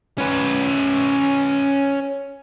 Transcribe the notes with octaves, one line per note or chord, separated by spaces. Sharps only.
C#4 B4